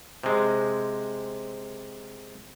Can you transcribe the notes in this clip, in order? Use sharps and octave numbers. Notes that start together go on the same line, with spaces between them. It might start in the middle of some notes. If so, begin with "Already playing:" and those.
C3 G#3